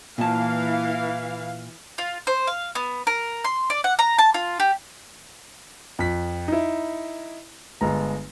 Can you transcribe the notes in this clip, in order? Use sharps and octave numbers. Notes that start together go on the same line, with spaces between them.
A#2 E3 F5 A5
F4
C5
F5
B3
A#4
C6
D5
F#5
A#5
A5
F4
G4
F2 B6
D#4 E4
G1 G#3 A#5